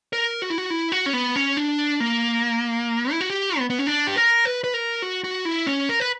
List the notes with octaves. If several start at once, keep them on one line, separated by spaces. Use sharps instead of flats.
A#4
F#4
E4
F#4
E4
F#4
C#4
B3
C#4
D4
A#3
E4
F#4
G4
B3
B3
C#4
D4
G4
A#4
B4
B4
A#4
F#4
F#4
E4
C#4
A#4
B4